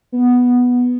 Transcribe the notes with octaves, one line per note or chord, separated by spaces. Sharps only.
B3